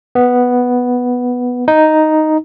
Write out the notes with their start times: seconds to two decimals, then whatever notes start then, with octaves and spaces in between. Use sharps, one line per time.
0.15 B3
1.68 D#4